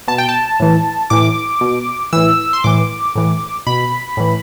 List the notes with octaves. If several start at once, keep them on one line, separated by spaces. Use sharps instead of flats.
B2 A5
G5
A5
A2 E3
A2 E3 D6
B2
A2 E3 E6
C6
A2 E3 D6
A2 E3
B2 B5
A2 E3